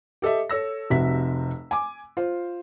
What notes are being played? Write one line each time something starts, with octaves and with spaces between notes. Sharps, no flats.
G4 A4 D#5 E5
A4 C#5 E6 A#6
F1 C3 F#4 E5 B6
G#5 D6
F4 C5